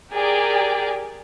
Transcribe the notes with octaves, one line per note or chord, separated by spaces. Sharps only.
G4 G#4 A#4 D5 G5